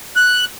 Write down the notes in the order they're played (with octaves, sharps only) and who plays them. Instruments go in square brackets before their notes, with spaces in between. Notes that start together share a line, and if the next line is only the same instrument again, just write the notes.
[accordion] F#6